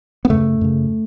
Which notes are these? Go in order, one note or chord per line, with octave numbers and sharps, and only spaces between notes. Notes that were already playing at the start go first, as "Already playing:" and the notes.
B3
F#2 C#3 A3
F#2 C#3